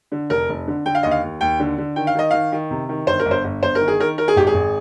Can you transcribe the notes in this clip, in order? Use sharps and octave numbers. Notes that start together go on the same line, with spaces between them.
D3
F1 A#4
F1
D3
D3 G5
F5
D#2 D#5
F5
D#2
D#2 G5
D3
D3
D#3 G5
F5
D#3 D#5
D#3 F5
D#3
C3
D#3
G1 C5
A#4
G1
C5
G1
G1 C5
A#4
D#3
G#4
D#3 A#4
D#3 A#4
G#4
G#1 G4
G#4
G#1